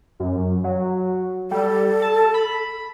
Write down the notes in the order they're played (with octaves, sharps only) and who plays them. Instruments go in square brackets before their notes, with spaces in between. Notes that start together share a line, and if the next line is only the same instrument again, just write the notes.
[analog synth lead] F#2
F#3
[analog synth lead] G3 [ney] A4
[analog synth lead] A5
B5